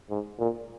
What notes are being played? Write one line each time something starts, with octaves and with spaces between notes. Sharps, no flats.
G#2
A#2